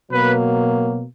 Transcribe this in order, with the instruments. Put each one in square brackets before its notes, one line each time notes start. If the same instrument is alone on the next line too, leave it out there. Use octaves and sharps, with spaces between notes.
[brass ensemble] B2 F#3 A#3 B4